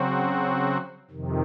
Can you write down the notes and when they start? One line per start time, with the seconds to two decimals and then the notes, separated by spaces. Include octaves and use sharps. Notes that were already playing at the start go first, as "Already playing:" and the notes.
Already playing: C#3 F#3 C4 F#4
1.10 F2 C3 D#3